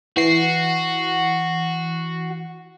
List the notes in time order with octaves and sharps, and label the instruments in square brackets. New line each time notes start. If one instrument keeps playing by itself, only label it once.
[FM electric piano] E3 C7 [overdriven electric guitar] F#4